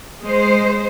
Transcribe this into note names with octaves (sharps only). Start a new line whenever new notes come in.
G#3 C5